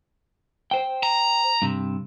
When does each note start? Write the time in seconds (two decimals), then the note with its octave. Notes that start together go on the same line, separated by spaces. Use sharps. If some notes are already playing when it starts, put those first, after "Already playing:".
0.71 C5 G5
1.03 A#5
1.62 G2 C3